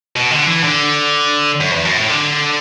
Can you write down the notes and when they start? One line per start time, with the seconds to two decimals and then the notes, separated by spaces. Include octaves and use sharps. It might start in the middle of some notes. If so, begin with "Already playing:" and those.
0.16 B2
0.31 D3
0.47 E3
0.64 D3
1.60 F#2
1.72 E2
1.85 F#2
1.96 A2
2.09 D3